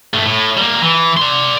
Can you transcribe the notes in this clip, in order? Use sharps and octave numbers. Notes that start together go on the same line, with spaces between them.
G2 A3
A2
G3 A#3
E3
D5 C6